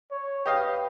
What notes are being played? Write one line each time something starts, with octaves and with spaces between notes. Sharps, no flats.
C#5
G4 B4 D#5 F5